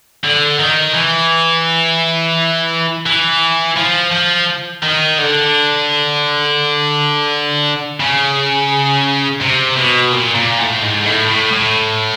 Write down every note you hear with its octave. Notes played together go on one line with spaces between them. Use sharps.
D3
D#3
E3
E3
F3
F3
D#3
D3
C#3
C3
B2
A#2
A#2
A2
G#2
A2
A2
A2